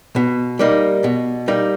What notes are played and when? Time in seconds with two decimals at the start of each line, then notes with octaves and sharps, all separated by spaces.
0.16 B2
0.59 G3 A#3 D#4
1.04 B2
1.48 G3 A#3 D#4